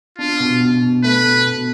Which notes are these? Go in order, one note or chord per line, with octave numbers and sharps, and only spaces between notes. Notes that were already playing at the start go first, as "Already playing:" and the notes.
D4 F4
B2
B2
B2
A3 B4
B2
B2